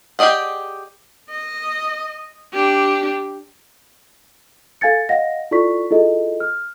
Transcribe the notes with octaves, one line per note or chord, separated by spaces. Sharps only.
G4 G#4 D5 D#5 F#5
D#5
D4 G4
A4 F5 G#5 G#6 A6 C#7
D#5 F5 F#5 A#6
E4 F4 A4 D5 C#6 B6
E4 F4 G#4 A4 D#5
F6